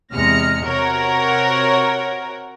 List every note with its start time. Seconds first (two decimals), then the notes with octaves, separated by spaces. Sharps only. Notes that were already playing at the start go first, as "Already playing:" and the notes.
0.13 E2 C3 G#3 F6 A#6 C#7
0.66 C3 F#4 A#4 C#5